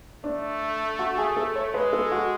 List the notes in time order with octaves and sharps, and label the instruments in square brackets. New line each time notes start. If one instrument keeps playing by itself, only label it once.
[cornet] A3 [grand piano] D4
[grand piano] F#4
G#4
A4
C#5
[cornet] G#3 [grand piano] B4
[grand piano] A4
F#4